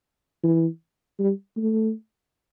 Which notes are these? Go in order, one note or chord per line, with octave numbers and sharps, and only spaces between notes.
E3
G3
A3